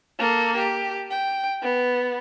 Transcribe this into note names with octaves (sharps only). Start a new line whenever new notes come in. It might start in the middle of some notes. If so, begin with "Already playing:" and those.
A#3 A4
G4
G5
B3